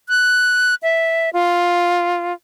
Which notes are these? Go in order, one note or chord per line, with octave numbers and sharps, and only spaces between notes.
F#6
E5
F4